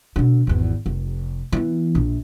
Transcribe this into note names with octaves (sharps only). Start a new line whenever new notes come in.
B2 D3
G#1 E2
F1
E3 B3
A#1